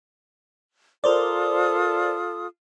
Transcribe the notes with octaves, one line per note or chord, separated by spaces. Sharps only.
F4 A4 A#4 C5 D5 D#6